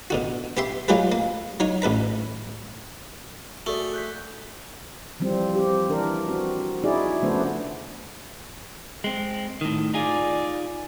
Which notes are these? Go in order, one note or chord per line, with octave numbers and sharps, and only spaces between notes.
B2 D3 F#4
B3 G4 E5 C6
F#3 G#3 F4 G4 G#4 B4
A#3
F#3 D#4 C#5
A1 A4 B4 A#5
A3 F#4 G#4 D5
F#6 G6 B6
E3 F3 G3 C4
C4 G4
E3 D4 A#4
C4 F#4
D#4 E4 F#4 G#4 D5
C#3 F3 A3 B3 D4 C5
G#3 C4
A2 D#3
D#4 F4 G#4 D5